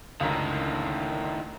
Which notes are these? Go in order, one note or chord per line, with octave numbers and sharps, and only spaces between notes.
C#2 F#2 A2 D3 D#3